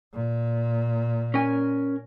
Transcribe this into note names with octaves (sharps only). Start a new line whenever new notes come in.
A#2
C#4 A#4 G#5